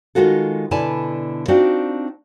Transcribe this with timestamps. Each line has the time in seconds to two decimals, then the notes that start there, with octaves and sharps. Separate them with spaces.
0.15 D#3 F#3 G#3 F4 F#4 A4
0.71 B2 D3 E4 D5 G#5 A5
1.48 C4 D4 D#4 F4 F#4 D5